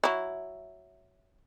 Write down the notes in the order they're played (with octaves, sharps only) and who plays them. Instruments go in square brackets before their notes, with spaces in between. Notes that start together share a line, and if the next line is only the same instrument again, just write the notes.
[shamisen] F#3 E4